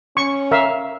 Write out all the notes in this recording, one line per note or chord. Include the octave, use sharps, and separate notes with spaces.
C#4 C#6
A#4 E5 F5